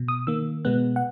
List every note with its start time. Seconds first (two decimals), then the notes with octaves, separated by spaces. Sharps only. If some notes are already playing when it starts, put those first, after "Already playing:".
Already playing: B2
0.08 D#6
0.27 D#3 A#3 E6
0.65 B2 G#3 B3 F#6
0.96 F#5